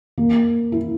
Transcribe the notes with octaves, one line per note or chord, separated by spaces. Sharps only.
A#3
E4